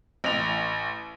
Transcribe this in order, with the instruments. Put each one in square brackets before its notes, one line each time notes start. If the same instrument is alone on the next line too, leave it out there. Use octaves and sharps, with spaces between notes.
[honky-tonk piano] A1 F7